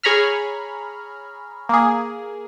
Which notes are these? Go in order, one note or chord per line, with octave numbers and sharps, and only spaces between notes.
G#4 C#5 A#5 B5 F6
A#3 G#4